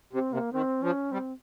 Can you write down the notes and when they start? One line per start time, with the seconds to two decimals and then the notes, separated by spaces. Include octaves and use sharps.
0.13 C3 C4
0.32 C3 A#3
0.53 D#3 C4
0.82 F3 C#4
1.12 G3 C4